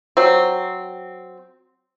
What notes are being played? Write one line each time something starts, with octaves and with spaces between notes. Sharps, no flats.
F#3 C4